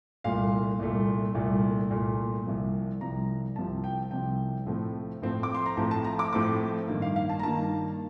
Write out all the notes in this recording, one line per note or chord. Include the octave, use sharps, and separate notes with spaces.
C2 A#2 A3 F5
C2 A#2 A3
C2 A#2 A3
C2 A#2 A3
C2 C3 F3
C2 C3 F3 A#5
C2 C3 F3 A5
G5
C2 C3 F3 G5
A2 F3 A3 C4
A2 F3 A3 C4
D6
C6
A#5
A2 F3 A3 C4 A5
A5
A#5
D6
A2 F3 A3 C4 D6
G2 D#3 A#3
F5
F5
A5
A#5
G2 D#3 A#3 A5